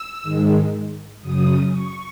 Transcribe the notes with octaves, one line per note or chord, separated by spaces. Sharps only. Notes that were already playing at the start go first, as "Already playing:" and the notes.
Already playing: E6
G#2 D#3 G#3
F#2 C#3 F#3 D#6
C#6